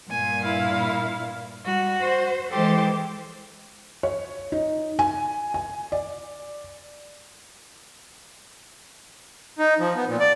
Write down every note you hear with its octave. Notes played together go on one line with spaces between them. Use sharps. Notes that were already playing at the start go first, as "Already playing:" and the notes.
G2 A#2 G#5
E4 F5
G3 F#4
C5
E3 G#3 G4 A4 C5
C#5
D#4
G#5
G#5
D5
D#4
F3
B3
A#2
D5